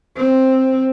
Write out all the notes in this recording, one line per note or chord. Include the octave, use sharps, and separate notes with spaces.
C4